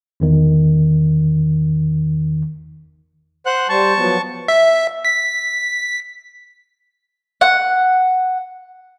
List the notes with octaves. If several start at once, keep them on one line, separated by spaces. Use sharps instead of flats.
G1 E2 D#3
C5 F#5 F#6
G3 C5 A5 C#6
F3 F#3 B3
E5
B6
F#5